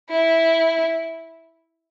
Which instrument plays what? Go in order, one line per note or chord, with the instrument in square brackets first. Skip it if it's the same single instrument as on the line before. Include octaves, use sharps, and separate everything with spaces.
[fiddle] E4